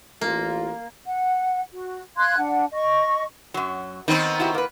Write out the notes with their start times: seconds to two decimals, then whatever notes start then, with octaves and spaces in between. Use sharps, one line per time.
0.21 A1 A#3 F4
1.06 F#5
1.72 F#4
2.17 F5 C6 F#6 G#6
2.37 D4 F#5
2.73 D#5 C#6
3.54 F#2 F#3
4.08 D#3 B3 C4 D#4
4.40 E4 F#4 G4
4.54 A#3 B4